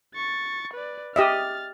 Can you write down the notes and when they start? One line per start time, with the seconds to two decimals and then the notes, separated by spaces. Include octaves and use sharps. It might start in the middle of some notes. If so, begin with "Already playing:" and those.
0.15 C#6 A6
0.74 B4 D5
1.16 G4 D#5 E5 F6 A6